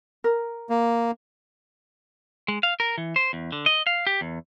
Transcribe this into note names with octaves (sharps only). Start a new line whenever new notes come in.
A#4
A#3
G#3
F5
A#4
E3
C5
E2
D3
D#5
F5
G4
E2